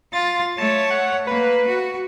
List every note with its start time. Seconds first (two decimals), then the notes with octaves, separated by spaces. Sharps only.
0.13 F4 A6
0.58 A3 C#5 A5
0.90 F#5
1.27 A#3 B4
1.67 F#4